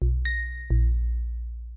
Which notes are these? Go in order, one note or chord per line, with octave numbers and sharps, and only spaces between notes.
B1
A#6
A#1